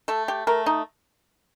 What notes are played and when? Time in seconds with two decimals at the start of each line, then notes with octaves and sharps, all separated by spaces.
0.08 A3 A4
0.28 G4
0.47 A3 A#4
0.66 D#4